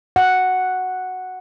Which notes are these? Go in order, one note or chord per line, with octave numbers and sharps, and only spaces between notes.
F#5